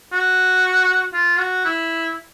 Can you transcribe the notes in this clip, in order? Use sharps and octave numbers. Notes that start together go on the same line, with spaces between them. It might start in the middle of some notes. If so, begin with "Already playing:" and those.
F#4
F4
F#4
E4